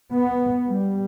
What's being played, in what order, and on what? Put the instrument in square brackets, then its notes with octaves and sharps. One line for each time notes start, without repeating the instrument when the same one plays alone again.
[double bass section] B3
G3